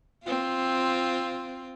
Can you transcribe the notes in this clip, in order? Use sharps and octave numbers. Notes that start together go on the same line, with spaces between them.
C4 F4